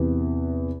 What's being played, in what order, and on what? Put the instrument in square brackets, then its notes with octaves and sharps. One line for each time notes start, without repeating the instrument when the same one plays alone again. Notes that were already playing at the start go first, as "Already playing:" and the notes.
Already playing: [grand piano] E2 C3 E3